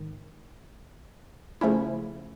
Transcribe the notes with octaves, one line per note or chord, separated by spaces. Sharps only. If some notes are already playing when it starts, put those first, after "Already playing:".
Already playing: G#2 D#3
C#3 F3 A3 C#4 E4